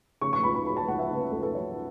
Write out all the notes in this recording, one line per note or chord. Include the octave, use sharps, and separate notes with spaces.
C#3 C#6
C#6
C#2 B5
B5
F#3 B5
A5
C#2 F#5
E5
C#3 B4
C#2 A4
A4
F#3 C#5